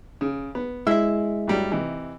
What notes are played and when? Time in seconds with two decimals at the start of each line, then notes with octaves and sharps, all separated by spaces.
0.21 C#3
0.55 B3
0.87 G#3 E4 E5 E6
1.47 G2 F#3 G3
1.71 C3 E3 D#4